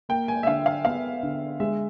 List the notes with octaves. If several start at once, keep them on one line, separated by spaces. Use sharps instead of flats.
A#3 G5
G#5
E5
D3 F5
F5
B3 F5
D3
G#3 E5